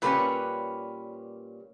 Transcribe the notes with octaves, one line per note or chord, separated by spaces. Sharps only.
A#2 G3 A#3 C#4 B4